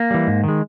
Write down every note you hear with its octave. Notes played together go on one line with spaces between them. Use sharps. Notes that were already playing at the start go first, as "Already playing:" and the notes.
Already playing: A#3
E3 G3
G#2
D#3 G#3